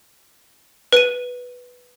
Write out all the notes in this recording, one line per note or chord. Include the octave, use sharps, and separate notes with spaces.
B4 D#7